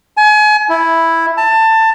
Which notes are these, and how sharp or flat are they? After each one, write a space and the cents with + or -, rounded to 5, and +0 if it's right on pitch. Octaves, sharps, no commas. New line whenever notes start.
G#5 +35
E4 +0
A5 +20